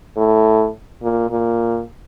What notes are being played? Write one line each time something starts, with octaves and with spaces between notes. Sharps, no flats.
A2
A#2
A#2